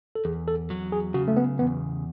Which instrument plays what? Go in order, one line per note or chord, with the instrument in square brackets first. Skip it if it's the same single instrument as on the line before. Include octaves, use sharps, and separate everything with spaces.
[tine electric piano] A4
[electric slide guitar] E2 [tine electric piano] G#4
[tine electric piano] A4
[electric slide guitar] F#3
[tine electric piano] G#4
[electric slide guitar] C#3 [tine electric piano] F#4
[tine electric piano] A3
B3
[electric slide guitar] E2 [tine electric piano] B3